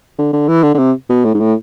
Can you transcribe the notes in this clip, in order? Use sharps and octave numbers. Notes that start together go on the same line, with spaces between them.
D3
D3
E3
D3
D3
C3
B2
A2
G#2
A2